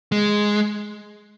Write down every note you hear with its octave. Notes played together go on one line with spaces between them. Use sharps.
G#3